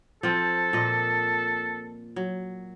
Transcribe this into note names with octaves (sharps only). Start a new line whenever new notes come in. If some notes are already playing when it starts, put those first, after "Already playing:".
F3 C4 A4
A#2 D#5
F#3